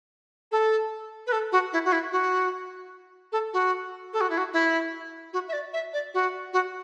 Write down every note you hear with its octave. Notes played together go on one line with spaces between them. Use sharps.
A4
B4
A4
F#4
E4
F#4
E4
F#4
A4
F#4
A4
F#4
E4
F#4
E4
F#4
E5
D5
E5
D5
F#4
F#4